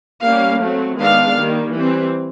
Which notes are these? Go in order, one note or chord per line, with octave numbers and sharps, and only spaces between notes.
G3 A#3 C#4 F5
F#3 A3 C4
D#3 G#3 B3 D4 F5
D#3 G3 A#3
E3 G3 C4